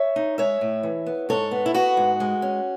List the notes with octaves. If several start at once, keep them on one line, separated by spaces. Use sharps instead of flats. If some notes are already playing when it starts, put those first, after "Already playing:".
Already playing: C#5 E5
D#4
G#3 C#5 E5
A2
E3
B3
G#2 A4 C#5
B3
E4
B3 F#4
G#2
G#3
C#4